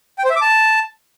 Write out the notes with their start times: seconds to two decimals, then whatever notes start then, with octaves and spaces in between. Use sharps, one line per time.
0.19 G5
0.24 C5
0.30 E5
0.36 D6
0.42 A5